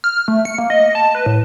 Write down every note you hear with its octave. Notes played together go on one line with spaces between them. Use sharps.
F6
A3
C#7
A#3
D#5
A5
B4
A2